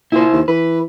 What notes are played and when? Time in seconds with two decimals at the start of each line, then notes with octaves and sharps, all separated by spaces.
0.12 A#2 E4 C5
0.33 D#2
0.48 E3 B4